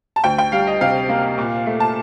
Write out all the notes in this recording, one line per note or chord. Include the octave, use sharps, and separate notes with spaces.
A5
D2 G5
G5
G3 F5
D#5
C3 F5
A#3
A#2
A3
A5